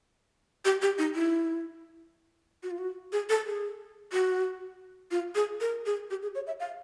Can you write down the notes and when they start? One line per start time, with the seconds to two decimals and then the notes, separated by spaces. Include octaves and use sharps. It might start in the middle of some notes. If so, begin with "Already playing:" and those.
0.65 G4
0.82 G4
0.98 D#4
1.15 E4
2.63 F#4
2.71 F4
2.78 F#4
3.12 G#4
3.29 A4
3.46 G#4
4.13 F#4
5.11 F4
5.35 G#4
5.61 A#4
5.86 G#4
6.10 G4
6.23 G#4
6.35 C#5
6.47 E5
6.60 F5